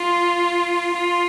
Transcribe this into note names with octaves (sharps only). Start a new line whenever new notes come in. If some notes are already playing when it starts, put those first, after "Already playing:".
Already playing: F4
F4